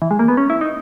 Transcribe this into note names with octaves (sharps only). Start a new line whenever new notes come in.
E3
G#3
A#3
B3
C#4
E4
D#4